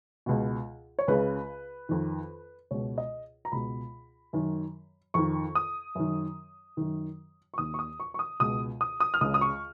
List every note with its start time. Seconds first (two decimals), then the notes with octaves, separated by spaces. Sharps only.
0.26 C#2 B2
0.99 C#5
1.08 C#2 C#3 B4
1.89 F2 D#3
2.71 C#2 B2 C#5
2.98 D#5
3.45 A#5
3.52 C#2 B2 B5
4.33 F#2 D#3
5.14 F2 D#3 C#6
5.55 D#6
5.95 F#2 D#3
6.77 F#2 D#3
7.54 C#6
7.58 D#2 D#3 D#6
7.74 C#6
7.79 D#6
8.00 C#6
8.14 C#6
8.19 D#6
8.40 C#2 B2 D#6
8.81 D#6
9.00 D#6
9.14 F6
9.21 C#2 C#3 D#6
9.34 D#6
9.41 C#6